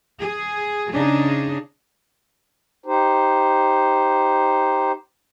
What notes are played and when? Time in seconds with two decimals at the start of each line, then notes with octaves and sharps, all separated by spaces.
0.20 G#4
0.91 C#3 D4 D#4 G#4
2.86 D#4 G4 C5